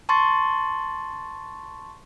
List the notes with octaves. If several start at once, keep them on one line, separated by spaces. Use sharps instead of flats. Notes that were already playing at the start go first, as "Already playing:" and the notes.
A5 C6 C#6 A6